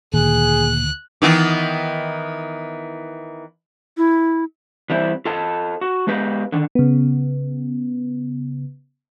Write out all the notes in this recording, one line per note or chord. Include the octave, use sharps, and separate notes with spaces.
D2 A#2 D#3 G#4 F#6
D#3 E3 B3
E4
E3 G3 C4 E4
F4 A4 D#5 A5
F#4
G#3 B3 G4 B4 D#5 F5
D3 D#3
C#3 B3